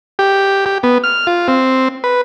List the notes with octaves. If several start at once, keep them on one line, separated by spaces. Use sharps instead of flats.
G4
G4
B3
F6
F4
C4
B4